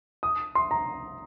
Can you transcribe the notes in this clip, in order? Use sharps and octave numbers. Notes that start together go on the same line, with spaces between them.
D#6
C6
A#5